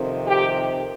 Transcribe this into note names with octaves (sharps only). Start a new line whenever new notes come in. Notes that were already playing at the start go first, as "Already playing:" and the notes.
Already playing: F2 C3 D#3
G4